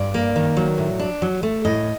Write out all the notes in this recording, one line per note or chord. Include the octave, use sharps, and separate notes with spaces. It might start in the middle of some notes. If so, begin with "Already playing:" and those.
Already playing: G2 D5
A#3
D#3
F#3
A2
D4
F#3
A3
A2 D#5